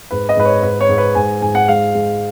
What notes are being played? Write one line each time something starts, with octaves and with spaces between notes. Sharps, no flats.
G#2 B4
D#5
G#2 B4
C#5
G#2 B4
C#5
G#2
B4
G#2 G#5
G#2 G#5
F#5
G#3 F5
G#3